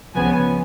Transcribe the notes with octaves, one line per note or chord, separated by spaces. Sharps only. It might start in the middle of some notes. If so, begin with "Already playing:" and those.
C#2 C#3 F3 B3 G#5